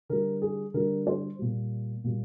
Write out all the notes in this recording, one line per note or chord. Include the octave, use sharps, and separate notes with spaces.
D3 G3 A#4
G#4
D3 G3 A#4
C5
A#2 G3
A#2 G3